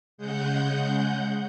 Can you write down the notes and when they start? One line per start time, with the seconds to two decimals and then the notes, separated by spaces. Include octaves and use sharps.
0.18 C#3 G#3 F#5 G6